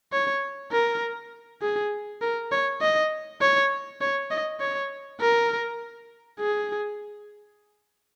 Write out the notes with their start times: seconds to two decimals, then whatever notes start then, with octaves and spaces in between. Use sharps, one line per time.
0.13 C#5
0.72 A#4
1.62 G#4
2.22 A#4
2.52 C#5
2.81 D#5
3.41 C#5
4.01 C#5
4.31 D#5
4.60 C#5
5.21 A#4
6.40 G#4